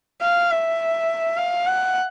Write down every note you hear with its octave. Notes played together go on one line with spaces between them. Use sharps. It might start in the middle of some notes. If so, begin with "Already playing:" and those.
F5
E5
F5
F#5